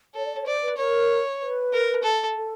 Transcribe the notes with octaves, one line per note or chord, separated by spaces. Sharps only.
A4 C#5
D5
C#5
C5 D5
B4
A#4 C#5
B4
A#4
A4
A4